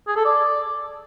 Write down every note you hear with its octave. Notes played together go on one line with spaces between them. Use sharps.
G#4
A4
D5